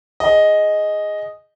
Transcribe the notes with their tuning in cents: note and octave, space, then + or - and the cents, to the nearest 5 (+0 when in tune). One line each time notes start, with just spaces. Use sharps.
G#4 +0 D#5 +0